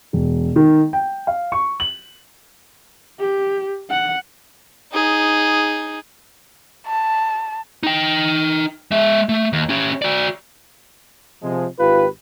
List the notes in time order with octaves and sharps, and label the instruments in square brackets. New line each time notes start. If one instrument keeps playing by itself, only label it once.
[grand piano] E1
D#3
G5
F5
C#6
F#7
[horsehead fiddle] G4
F#5
[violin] D#4 G#4
[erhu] A5
[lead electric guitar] D#4 G5
G#3 E5
A3
D#2
C#4 G4
F#4 D5
[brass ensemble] C3 F3 G#3
G#1 F4 G4 B4